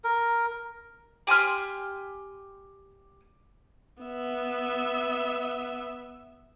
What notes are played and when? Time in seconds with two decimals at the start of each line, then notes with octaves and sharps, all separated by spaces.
0.04 A#4
1.27 G4 G#5 C6 F6
4.03 B3 E5